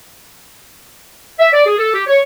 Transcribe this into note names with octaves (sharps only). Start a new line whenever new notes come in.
E5
D5
G#4
A4
G4
C#5